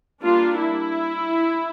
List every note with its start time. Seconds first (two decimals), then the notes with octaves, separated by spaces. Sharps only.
0.22 G3 A#3 D4 F4
0.58 E4